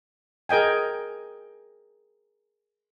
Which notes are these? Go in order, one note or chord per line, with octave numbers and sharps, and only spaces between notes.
G#4 A#4 D#5 G5 G#5